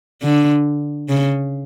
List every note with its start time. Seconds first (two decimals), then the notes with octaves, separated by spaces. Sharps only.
0.22 D3
1.09 C#3